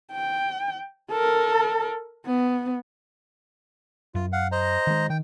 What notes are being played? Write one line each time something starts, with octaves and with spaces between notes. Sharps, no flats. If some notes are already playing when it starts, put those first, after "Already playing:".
G5
A4 A#4
B3
F#2 F4
F5 F#5
C5 D#5 A#5
D#3 G#3
D#3 G5